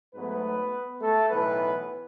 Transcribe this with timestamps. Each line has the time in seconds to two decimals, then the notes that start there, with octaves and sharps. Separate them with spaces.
0.15 G#2 F#3 A3 B3 B4
1.01 A3 A4
1.29 B1 A2 E3 B3 B4